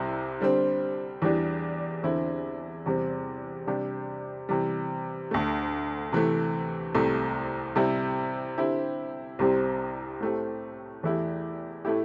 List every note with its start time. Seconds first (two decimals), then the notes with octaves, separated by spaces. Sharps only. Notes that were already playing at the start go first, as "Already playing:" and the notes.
Already playing: C2 C3 G3 E4
0.40 D3 G3 C4
1.22 E2 E3 G3 D4 G4
2.03 E2 D3 C4 E4
2.86 E2 C3 G3 C4
3.67 C3 G3 D4 G4
4.49 C3 E3 G3
5.31 D2 D3 A3
6.12 C3 E3 A3
6.95 C2 C3 A3
7.76 C3 G3 E4 G4
8.58 D3 C4 E4 G4
9.39 C2 C3 G3 C4 G4
10.21 A2 A3 C4 G4
11.03 E2 E3 A3 E4 G4
11.85 A2 A3 E4 G4